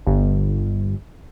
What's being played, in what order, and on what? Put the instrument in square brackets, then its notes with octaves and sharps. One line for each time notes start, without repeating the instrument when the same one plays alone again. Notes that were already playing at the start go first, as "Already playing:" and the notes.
[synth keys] G1